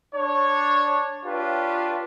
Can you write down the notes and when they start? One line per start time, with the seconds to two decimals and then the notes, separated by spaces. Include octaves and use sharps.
0.15 D4 C#5
1.26 D4 F4 G4 B4 C#5